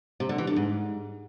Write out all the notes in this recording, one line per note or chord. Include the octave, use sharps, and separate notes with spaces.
C3
D3
E3
D3
G#2